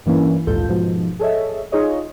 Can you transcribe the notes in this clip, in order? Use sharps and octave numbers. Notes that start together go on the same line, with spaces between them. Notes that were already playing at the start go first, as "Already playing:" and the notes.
G2 E3 A#3 C#4 E4
A#1 D#2 G#2 F4 A4 G6
G#2 B2 F3
G#4 A4 C#5 D#5 E5
D#4 F4 G#4 C#5 D#5